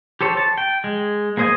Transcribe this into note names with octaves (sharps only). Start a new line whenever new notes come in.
G4 A4 C5 C#5
A5
G5
G#3
A#3 G#4 C5 D#5 G#5